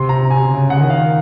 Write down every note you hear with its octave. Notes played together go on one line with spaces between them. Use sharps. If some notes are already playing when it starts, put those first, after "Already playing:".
Already playing: C3 C6
A#5
G#5
C#3
F#5
D#3
F5